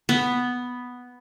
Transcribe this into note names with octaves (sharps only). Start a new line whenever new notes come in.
B3